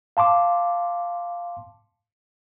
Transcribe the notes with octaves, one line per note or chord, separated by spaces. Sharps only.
F5 A5 C6 D6